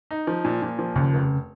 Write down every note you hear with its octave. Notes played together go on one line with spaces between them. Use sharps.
D#4
F3
A#2
A#2
F3
D#2 C#3
F1